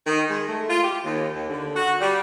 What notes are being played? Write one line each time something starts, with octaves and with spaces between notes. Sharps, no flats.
D#3
G#3
A3
F4
G4
D#2
D#2
D3
F#4
G3